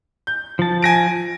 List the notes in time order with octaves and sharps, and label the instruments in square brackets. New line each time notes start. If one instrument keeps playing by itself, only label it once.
[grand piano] G6
[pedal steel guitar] F3 A5
[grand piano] G#5 A#6 D7